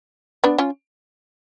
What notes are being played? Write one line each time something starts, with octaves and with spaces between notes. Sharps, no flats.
B3 D4
C#4 F4